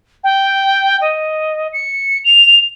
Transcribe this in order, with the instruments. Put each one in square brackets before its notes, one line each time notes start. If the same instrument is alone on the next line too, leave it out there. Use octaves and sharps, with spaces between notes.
[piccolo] G5
D#5
C#7
F7